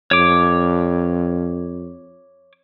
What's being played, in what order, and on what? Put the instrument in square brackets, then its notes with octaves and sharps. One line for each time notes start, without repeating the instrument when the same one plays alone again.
[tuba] F2 [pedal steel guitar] C#5 D6